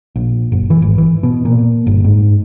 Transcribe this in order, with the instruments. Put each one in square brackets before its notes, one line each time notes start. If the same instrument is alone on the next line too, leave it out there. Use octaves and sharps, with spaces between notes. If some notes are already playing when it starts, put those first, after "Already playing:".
[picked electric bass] A#1
F#1
E3
G#1
E3
B2
A#2
G1
G#2